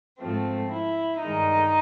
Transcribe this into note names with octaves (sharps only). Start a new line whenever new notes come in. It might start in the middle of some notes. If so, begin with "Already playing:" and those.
G#2 F3 A3 C4
E4
G2 D#3 G#3 D#4